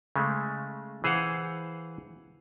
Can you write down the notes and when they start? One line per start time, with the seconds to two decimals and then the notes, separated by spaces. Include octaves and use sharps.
0.16 C#3 G#3 A3
1.04 E3 G#4 C5 F5 F#5